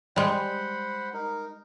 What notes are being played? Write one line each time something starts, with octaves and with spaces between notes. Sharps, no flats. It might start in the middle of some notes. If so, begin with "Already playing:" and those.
G3 G#3 C5 F#5 B5
D#4 A#4